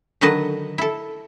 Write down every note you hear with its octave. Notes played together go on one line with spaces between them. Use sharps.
D3 D#3 F#3 B4 D#5 A5
E4 A4